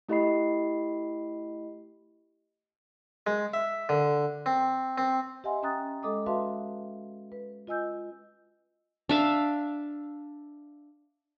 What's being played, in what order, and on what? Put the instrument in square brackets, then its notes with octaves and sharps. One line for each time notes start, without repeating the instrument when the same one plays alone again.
[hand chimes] A3 E4 G4 D#5 B5 C7
[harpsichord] G#3
E5
D3
C4
C4
[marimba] G4 D#5 E5 F#5 G#5 C6
C#4 G5 A#5 D#6 F#6 A6
G#3 A4 D#5 D6 D#6
F#4 B4 E5 F5 A5 C6
B4
F4 D#5 G#5 E6 G6
[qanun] D4 E5 F5